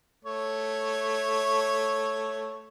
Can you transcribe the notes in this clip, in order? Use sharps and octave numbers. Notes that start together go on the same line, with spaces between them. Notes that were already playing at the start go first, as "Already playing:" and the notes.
A3 C#5